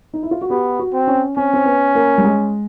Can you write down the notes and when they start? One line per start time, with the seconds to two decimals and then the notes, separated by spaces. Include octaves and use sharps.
0.14 D#4
0.23 E4
0.31 F4
0.41 F#4
0.50 B3 G4
0.79 F#4
0.93 C4
1.07 C#4
1.37 C4 C#4
1.54 C4
1.66 B3
1.95 A#3
2.18 G3
2.24 G#3